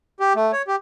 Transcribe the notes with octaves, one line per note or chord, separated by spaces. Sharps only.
G4
A3
C#5
G4